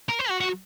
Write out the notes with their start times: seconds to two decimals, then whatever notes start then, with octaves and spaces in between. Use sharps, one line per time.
0.09 A#4
0.19 C5
0.29 F#4
0.40 F#4